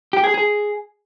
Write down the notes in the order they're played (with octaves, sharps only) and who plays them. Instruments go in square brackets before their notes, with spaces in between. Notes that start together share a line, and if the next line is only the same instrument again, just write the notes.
[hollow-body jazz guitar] G4
G#4
G#4